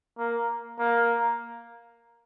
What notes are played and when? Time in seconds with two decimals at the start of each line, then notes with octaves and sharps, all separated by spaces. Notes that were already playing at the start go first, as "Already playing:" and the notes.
0.18 A#3
0.79 A#3